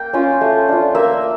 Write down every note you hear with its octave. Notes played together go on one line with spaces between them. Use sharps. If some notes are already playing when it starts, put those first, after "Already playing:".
Already playing: A#3 G5
C#4 F4
A3
D4 F4
A#3 E5